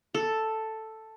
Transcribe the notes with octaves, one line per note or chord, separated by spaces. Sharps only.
A4